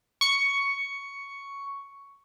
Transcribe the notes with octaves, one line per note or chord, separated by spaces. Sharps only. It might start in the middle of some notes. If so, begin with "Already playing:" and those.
C#6 C#7